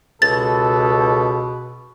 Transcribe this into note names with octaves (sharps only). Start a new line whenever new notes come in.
C#2 B2 A4 A6